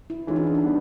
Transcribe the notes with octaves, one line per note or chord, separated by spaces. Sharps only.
E4
E3 G#3 C#4 D#4 F4
D4
D#4
D4
G3 B3